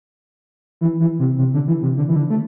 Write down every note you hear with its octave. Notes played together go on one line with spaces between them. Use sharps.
E3
E3
C3
C3
D3
E3
C3
D3
E3
D3
A3